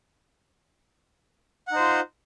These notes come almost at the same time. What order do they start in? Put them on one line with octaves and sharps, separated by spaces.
F#5 D#4 C5 F4